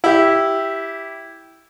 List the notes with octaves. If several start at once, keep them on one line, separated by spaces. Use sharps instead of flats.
E4 G4